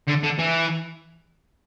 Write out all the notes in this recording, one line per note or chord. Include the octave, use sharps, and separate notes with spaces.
D3
D3
E3